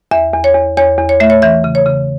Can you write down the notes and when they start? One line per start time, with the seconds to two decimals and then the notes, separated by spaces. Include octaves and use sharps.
0.11 E2 E5
0.33 E2
0.44 C#5
0.55 E2
0.77 E2 C#5
0.99 E2
1.09 C#5
1.20 A3 E5
1.30 C#5
1.42 E3 E5
1.64 C#3
1.75 C#5
1.86 C#3